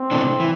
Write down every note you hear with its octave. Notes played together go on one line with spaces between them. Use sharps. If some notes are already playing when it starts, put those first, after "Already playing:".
Already playing: C4
C3 E3 A3 D4
E3